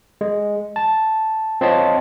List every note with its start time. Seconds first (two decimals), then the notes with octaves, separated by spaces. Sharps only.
0.21 G#3
0.76 A5
1.61 C4 F4 C#5 D#5 A5